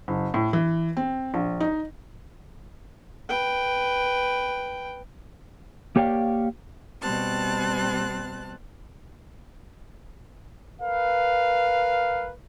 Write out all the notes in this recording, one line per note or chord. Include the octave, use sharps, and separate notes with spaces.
F#1
A2
E3
C4
A#1
D#4
B4 G5
A#3 G4 C#5 D5 F5 G5
B2 G3 C4 A5 F#6
A#4 B4 F5